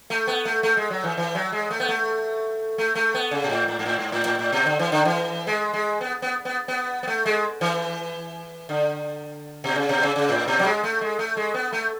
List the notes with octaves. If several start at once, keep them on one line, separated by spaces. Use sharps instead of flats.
A3
B3
A3
A3
G#3
F#3
E3
E3
F#3
G#3
A3
B3
A3
A3
A3
B3
C#3
B2
A2
A2
G#2
A2
G#2
A2
A2
A2
B2
D3
E3
D3
E3
G#3
G#3
B3
B3
B3
B3
B3
A3
G#3
E3
D3
B2
C#3
B2
C#3
C#3
A2
B2
F#3
G#3
A3
G#3
A3
G#3
B3
A3